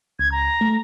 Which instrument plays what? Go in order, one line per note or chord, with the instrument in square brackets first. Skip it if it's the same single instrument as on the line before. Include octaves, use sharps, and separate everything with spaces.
[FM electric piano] C#2 [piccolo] G#6
[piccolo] A#5
[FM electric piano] A3